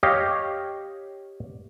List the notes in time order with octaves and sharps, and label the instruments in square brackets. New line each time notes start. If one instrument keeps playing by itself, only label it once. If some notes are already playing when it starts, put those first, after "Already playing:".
[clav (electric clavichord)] G4 C#5 D#5 F5